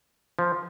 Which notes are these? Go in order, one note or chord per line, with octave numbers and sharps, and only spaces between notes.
F3